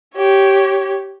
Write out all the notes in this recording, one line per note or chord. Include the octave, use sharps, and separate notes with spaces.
G4 C#5